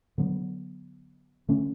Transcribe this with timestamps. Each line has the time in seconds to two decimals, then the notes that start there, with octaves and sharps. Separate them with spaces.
0.18 D3 F#3 B3
1.49 D3 A3 C#4